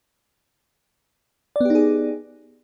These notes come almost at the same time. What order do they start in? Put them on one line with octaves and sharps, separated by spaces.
D5 B3 G4 D#4 G#4